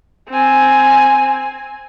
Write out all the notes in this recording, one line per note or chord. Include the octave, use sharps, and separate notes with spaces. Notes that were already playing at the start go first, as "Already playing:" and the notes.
C4 G#5